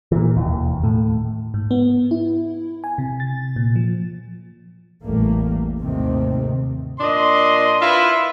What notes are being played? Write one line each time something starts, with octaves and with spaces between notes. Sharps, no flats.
A#2 E3
E1 D#2
A2
G#2
B3
E4
G#5
C3
A6
A#2
F3
A1 E2 G3 A3 A#3
D#2 G#2 C3 D#3 A3 C4
A#2 D4 D#5 C6
E4 F4 B4 E5